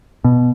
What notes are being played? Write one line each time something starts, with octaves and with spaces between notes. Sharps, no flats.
B2